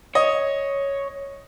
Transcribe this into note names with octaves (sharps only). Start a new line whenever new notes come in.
C#5 D#5